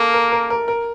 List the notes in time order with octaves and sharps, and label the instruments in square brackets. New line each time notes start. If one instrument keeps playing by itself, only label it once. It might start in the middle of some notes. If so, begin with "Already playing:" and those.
Already playing: [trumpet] A#3 [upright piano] A4 A#4
[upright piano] A#4
A#4
A#4
A#4